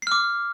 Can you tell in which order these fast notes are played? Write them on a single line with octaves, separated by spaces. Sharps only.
C7 F6 D6